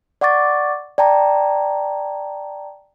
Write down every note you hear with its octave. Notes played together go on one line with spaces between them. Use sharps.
D5 F#5 C#6 D6 A6
D5 G5 A5 A#5